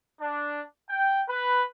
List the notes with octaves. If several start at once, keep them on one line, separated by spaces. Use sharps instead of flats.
D4
G5
B4